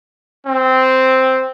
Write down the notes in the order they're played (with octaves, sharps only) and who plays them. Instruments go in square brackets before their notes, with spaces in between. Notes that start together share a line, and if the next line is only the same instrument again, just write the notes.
[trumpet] C4